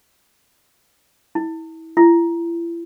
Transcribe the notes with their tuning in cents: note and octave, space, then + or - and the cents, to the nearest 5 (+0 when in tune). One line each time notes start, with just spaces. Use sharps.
E4 -30
E4 +40